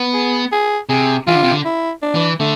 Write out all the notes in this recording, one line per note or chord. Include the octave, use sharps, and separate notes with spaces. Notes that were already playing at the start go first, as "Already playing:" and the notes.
Already playing: B3
G#4
G#4
C3 G#4
E3 F4
D3
C3
D3
E4
D4
E3
D3 A3